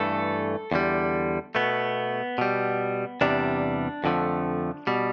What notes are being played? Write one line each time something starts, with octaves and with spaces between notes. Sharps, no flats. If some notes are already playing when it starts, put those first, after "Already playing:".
Already playing: G2 E3 A3 A4
E2 D3 G3
B2 A3 B3
B2 G3
E2 C3 G3 D4
F2 D3 F3 A3
B2 G3